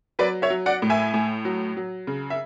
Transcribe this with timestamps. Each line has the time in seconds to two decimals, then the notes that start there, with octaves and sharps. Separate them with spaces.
0.19 F#3 B4 D5
0.42 C#5 E5
0.50 F#3
0.66 D5 F#5
0.82 A2
0.90 E5 G#5
1.14 A2
1.45 F#3
1.77 F#3
2.07 C#3
2.30 E5